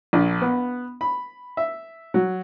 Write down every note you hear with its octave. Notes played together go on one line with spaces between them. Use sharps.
A#1
B3
B5
E5
F#3